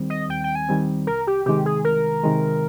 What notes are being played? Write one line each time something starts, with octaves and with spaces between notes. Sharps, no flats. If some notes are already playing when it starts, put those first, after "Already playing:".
Already playing: D#2 D#3 G3 C4
D#5
D#2 G5
G5
G#5
D#3 G3 C4
C2 A#4
G4
C3 D#3 G#3 G4
G#4
C2 A#4
C3 D#3 G#3